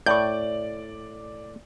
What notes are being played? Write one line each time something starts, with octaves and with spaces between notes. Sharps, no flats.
A2 D5 C#6 G6